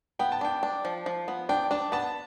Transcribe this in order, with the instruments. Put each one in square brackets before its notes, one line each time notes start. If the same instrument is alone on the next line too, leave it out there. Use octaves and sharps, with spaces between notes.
[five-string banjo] B3 [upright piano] G5
[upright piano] A5
[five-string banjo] D4 [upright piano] G5
[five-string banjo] D4
F3
F3
B3
[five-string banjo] D4 [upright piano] G5
[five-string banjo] D4 [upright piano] A5
[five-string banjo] B3 [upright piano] A5